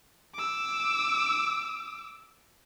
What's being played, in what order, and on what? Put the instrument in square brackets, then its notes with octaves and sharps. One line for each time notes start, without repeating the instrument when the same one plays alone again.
[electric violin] D6 E6